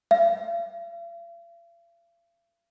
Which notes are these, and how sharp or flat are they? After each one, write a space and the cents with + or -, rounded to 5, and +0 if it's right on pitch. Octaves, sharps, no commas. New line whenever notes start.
F5 -45